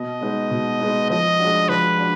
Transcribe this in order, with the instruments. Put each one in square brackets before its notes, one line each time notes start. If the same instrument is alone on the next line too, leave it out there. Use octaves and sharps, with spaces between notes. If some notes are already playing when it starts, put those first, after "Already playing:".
Already playing: [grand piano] B2 [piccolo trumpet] D#5
[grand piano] G#3 B3 D#4
B2
G#3 B3 D#4
[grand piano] F3 [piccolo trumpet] D#5
[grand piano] G#3 D4 F#4
[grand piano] F3 [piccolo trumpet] B4
[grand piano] D4 F#4